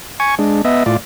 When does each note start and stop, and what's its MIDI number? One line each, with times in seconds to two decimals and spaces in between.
0.20 0.35 80
0.20 0.35 85
0.39 0.62 56
0.39 0.62 62
0.65 0.83 59
0.65 0.83 75
0.65 0.83 76
0.86 0.97 45
0.86 0.97 65
0.86 0.97 74